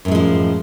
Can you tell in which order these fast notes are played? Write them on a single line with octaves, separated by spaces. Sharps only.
F#2 A2 G#3 F3